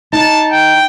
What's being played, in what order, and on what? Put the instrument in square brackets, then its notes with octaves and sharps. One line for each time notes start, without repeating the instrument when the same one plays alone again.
[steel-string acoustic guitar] D#4 [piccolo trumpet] A5
[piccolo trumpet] G5